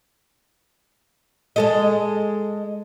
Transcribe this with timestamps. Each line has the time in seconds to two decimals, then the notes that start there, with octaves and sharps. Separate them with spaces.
1.56 G#3 A4 D#5